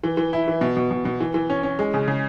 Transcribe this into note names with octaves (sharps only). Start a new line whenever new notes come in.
E3
E3
E4
E3
B2
B2
B2
B2
E3
E3
C#4
C#4
G#3
C#3
C#3